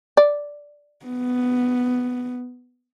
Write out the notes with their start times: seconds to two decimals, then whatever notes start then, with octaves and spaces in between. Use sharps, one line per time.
0.17 D5
1.05 B3